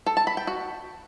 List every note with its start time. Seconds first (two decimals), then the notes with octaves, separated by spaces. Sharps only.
0.06 A4
0.17 A5
0.27 B5
0.37 G5
0.47 F#4